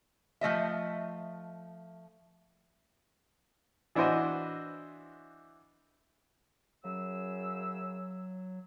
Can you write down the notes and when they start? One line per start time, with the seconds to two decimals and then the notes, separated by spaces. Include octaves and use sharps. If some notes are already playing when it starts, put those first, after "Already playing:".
0.41 F3 A3 D#5 E5
3.95 E3 D4 E4 F#4 C5 D#5
6.85 F#2 C#3 F#3 E6